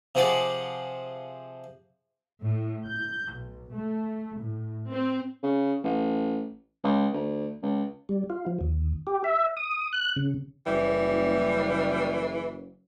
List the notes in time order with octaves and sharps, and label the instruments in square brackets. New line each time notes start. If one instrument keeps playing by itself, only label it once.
[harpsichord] C3 F3 G#4 F#5 D6
[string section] A2
G6
B1
A3
A2
C4
[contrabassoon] C#3
A1
C#2
D2
C#2
[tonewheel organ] G3
F4
F3
D#2
G4
E5
D#6
F#6
C#3
[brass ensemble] F#1 [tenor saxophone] E3 [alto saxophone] G3